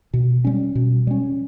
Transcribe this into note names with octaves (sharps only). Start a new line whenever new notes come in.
B2
G3 C#4
B2
G3 C#4